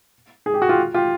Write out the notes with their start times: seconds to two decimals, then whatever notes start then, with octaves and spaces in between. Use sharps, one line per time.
0.46 G#4
0.54 G4
0.62 F#4
0.69 F4 G4
0.94 F4 G4